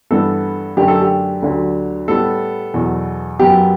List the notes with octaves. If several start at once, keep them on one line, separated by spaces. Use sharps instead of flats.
G2 E3 B3 A4
F#2 D3 A3 G4
A4
G4
D2 D3 F#3
A2 G3 B3 A4
E2 B2 F#3
F#2 F#3 B3 G4